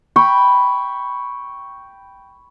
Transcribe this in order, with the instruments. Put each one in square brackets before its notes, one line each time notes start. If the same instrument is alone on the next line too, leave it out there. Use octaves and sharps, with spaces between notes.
[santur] G5 B5 C#6